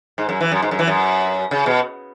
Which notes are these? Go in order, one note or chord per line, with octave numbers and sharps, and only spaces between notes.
G#2
F#2
E3
F#2
G#2
F#2
E3
F#2
C#3
B2